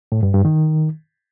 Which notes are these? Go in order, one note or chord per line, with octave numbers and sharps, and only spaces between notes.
A2
G2
G2
D#3